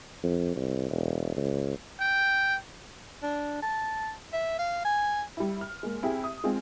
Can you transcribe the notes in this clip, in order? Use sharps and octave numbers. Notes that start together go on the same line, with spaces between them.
F2
C2
E1
C#2
G5
D4
A5
E5
F5
G#5
G3 E4
F6
G#3 A#3
C4 E4 G4 G#4
D#6
G#3 C4 D#4 F4 G#4